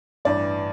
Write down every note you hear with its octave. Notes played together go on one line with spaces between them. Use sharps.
A1 G2 E3 D5